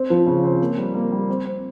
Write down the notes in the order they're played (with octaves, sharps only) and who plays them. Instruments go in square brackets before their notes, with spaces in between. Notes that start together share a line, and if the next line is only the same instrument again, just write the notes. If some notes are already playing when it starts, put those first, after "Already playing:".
Already playing: [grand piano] C4
F3
C#3
C4
A#3
G3
A#3
G3
C4
C4